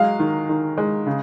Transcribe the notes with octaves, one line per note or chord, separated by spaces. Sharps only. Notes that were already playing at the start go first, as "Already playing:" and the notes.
Already playing: F#3 G#3 F5
D#3
D#3
G#3
C#3